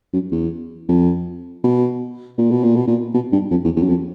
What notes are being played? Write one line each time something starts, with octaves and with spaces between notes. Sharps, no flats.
F#2
E2
F2
B2
A#2
B2
A#2
B2
A#2
B2
G2
F2
E2
E2
F#2
F2